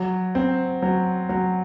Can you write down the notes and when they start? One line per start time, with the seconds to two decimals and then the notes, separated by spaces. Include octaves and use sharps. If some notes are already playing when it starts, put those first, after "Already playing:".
Already playing: F#3
0.35 C4
0.82 F#3
1.29 F#3